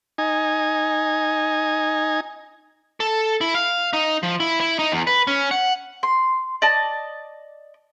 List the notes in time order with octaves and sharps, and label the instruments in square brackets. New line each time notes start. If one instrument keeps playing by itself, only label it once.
[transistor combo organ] D#4 G#5
[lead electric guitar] A4
E4
F5
D#4
F3
E4
E4
D#4
E2
B4
C#4
F#5
[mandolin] C6
D5 D#5 A5